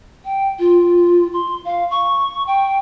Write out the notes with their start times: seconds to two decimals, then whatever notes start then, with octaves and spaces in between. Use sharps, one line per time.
0.25 G5
0.59 F4
1.33 C6
1.65 F5
1.90 C#6
2.47 G5